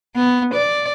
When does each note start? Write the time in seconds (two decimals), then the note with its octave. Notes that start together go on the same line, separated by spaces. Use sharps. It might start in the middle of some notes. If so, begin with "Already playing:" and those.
0.15 B3
0.54 D5